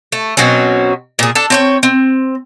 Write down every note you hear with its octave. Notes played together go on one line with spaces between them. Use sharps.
A3
B2 F#3 C4 C#4
A#2 G#4
D4 A4
C4 C#5 G5
C4